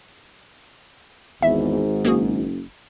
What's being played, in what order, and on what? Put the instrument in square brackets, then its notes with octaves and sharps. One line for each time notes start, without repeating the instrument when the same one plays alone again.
[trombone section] G#1 G#2 [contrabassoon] E2 [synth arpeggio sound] E5
[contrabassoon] F#1 [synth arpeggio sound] A#3 F#4 G#4